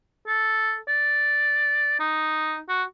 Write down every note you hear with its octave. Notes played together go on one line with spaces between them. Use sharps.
A4
D5
D#4
F#4